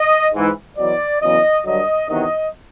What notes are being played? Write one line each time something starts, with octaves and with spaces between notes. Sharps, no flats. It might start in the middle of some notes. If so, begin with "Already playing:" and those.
Already playing: D#5
G#2 E3
E2 B2 F#3 D5
E2 C#3 F#3 D#5
G2 D3 F#3 D#5
E2 C3 D#3 F#3 D#5